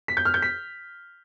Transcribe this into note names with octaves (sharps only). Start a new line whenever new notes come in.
B6
G6
F6
G6
B6